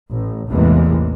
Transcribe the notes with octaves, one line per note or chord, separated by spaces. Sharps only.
A1
A1 E2 C3 E3 G#3 A#3